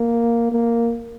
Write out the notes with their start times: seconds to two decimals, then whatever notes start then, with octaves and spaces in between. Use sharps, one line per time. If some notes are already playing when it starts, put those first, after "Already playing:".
Already playing: A#3
0.52 A#3